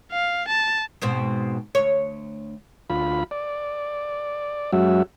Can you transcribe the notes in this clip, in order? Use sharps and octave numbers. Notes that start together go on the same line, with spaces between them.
F5
A5
G#2 B2 C4
D2 C#5
D2 F4 B5
D5
F#2 F#3 G#3 C#4 F#4 E5